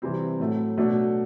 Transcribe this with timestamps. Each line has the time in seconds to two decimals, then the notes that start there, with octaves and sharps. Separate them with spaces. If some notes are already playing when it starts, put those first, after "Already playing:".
0.02 C3 E3 G3 C4
0.40 A2 F#3 A3
0.77 B2 F#3 A3 D4